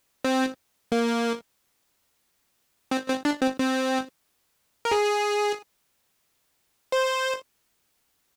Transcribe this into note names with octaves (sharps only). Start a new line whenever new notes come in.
C4
A#3
C4
C4
D4
C4
C4
A#4
G#4
C5